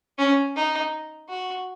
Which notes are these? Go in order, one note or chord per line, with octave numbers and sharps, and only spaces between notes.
C#4
D#4
F#4